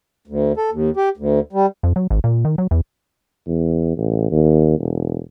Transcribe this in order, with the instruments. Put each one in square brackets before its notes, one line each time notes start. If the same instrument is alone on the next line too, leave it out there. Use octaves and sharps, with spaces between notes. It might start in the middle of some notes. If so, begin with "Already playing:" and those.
[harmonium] D2
A4
D#2
G4
D2
G3
[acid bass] F2
F#3
G#1
A#2
D#3
F#3
E2
[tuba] E2
A1
D#2
E1